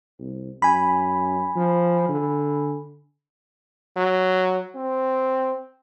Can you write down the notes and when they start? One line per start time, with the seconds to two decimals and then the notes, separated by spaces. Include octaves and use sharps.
0.19 C2
0.62 F#2 G#5 B5
1.56 F3
2.09 D3
3.97 F#3
4.75 C4